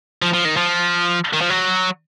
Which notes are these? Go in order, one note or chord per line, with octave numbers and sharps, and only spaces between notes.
F3
F3
D#3
F3
D#3
F3
F#3